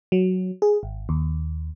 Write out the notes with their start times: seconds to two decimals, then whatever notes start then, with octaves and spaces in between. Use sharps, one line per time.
0.12 F#3
0.62 G#4
0.83 G#1
1.09 D#2